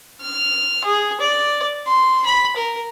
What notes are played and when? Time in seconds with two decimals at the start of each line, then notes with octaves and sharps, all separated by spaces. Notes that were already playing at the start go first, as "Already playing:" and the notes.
0.22 F6
0.84 G#4
1.20 D5
1.88 C6
2.26 B5
2.56 A#4